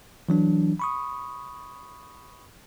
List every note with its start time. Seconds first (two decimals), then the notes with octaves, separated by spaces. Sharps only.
0.29 E3 F#3 D4
0.79 B5 C#6 D#6